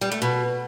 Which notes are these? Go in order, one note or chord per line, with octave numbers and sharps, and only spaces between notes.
G3
A3
B2